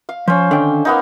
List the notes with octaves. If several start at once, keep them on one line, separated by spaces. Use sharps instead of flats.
F5
F3 C#4 C5
D3 D#3 G5
A#3 B3 D#4